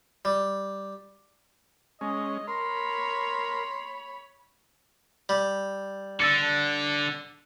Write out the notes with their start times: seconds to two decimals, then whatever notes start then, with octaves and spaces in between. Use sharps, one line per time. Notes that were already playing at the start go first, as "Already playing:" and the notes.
0.25 G3
2.01 G#3 C#4 D#5
2.48 A#4 C#5 B5 C6
5.29 G3
6.20 D3 E6 A6 C#7